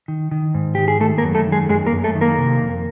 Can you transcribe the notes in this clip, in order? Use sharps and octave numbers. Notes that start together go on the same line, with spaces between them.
D#3
D#3
G#2
D#3 G4
G#4
D#3 A3 A4
A#3 A#4
F#2
A3 A4
D#3
G#3 G#4
F#2 G#3 G#4
A#3 A#4
F#2
A3 A4
D#3
A#3 A#4
C3
F2